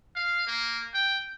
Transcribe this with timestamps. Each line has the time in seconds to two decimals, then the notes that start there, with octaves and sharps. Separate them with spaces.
0.16 F5
0.47 A#3
0.94 G5